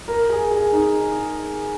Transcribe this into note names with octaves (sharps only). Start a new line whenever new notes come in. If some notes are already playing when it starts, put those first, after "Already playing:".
A#4
G#4
G#4
D#4